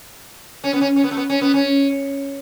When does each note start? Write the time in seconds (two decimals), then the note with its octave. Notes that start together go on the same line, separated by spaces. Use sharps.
0.64 C#4
0.73 B3
0.81 C#4
0.96 C#4
1.04 B3
1.11 A3
1.17 B3
1.30 C#4
1.41 B3
1.54 C#4